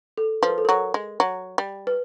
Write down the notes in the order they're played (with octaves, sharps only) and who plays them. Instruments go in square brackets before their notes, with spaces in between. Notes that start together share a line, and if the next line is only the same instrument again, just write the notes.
[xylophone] A4
[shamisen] F3 [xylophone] B4
[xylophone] A#4
A4
[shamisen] F#3 [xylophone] A#4
[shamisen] G#3
F#3
G3
[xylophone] B4